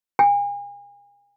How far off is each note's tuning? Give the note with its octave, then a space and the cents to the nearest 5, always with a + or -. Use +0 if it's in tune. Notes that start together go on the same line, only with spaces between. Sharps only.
G#5 -40